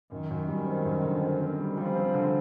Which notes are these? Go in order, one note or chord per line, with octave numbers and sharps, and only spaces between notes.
F#2 D#3
F#2
G3
C4
F#2
D3
C4
C4
G3
F3 G3
C4
D3